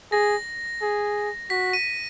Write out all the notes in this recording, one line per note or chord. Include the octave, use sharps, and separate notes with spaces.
G#4 A#6
G#4
F#4 B6
D#7